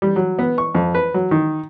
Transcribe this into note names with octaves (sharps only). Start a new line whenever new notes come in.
G3
F#3
B3
C#6
F2
B4
F#3
D#3